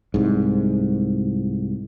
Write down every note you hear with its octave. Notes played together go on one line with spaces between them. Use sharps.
C2 G#2